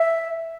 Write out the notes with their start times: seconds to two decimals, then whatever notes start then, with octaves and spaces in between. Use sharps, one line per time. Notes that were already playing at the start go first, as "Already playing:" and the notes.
Already playing: E5